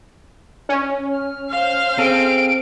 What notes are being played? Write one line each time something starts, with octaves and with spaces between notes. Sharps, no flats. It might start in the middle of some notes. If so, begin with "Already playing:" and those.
C#4
F6
C5 F5
C4 G#4 A4 D7